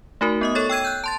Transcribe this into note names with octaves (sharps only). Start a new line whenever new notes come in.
A3 D#4 F#4 A#4
B3 D#5 D#6
A4 C#5 C#6 A6
G5 E6 G#6 D#7
F#6 G6
A5 C6 A6